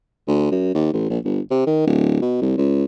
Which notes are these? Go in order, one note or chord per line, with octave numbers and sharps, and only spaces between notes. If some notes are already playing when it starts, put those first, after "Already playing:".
D2
F#2
D#2
A1
A#1
G1
C3
D#3
D1
B2
C2
C#2